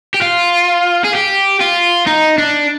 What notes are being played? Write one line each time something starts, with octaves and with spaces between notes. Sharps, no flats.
G4
F4
G#4
G4
F4
D#4
D4